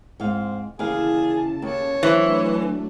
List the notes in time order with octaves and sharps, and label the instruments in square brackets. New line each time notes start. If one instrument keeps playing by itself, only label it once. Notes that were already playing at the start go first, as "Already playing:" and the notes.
[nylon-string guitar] G#2 F5 [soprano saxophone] C4
[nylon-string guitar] D#2 E3 F5 [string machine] C#3 A5 [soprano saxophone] G#4
[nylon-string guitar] D#2 [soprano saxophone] C#5
[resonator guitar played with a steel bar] E3 [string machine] F#3 A3 D4 [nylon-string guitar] C5